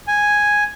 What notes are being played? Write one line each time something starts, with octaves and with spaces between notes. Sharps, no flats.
G#5